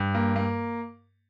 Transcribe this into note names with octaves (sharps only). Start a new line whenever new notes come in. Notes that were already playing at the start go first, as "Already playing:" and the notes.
Already playing: G2
A#3
A#3